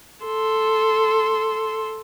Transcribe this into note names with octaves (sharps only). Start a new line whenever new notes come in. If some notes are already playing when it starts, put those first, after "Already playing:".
A4 C6